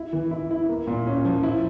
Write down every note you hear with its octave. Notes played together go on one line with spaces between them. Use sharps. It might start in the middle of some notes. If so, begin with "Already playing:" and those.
Already playing: E4
E3
E4
E4
A#3
A#2
C#4
F3
E4